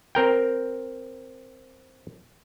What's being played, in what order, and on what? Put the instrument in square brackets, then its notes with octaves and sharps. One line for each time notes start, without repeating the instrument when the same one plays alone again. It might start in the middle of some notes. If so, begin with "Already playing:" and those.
[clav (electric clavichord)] C4 A#4 G5